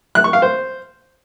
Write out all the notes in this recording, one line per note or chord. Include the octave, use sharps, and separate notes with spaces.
F#6
C#6
F5
C5